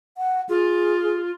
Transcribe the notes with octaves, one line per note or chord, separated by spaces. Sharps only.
F#5
F4 G#4